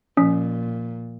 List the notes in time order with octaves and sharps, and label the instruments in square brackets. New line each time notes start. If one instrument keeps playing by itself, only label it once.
[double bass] A#2 [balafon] F3 [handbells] C#4